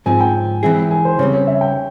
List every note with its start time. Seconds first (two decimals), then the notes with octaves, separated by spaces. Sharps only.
0.06 G#2 F3 C4 G#5
0.20 G5
0.63 E3 G#3 C4 E4 G#4
0.91 G#5
1.05 C5
1.19 C#3 G3 C4 C#5
1.34 C#5
1.47 E5
1.61 G5